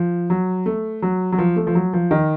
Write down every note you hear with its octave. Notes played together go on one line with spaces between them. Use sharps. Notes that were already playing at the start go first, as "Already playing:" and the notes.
Already playing: F3
F#3
A3
F#3
F#3
F3
A3
F3
F#3
F3
D#3